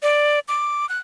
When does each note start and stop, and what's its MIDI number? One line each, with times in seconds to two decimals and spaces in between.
0.03 0.39 74
0.48 0.88 86
0.89 0.98 90